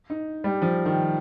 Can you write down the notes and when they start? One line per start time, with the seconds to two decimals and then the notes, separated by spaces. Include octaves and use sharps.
0.10 D#4
0.44 G3
0.62 F3
0.85 D#3